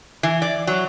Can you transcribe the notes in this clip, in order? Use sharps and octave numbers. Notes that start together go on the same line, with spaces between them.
E3
D5
F#3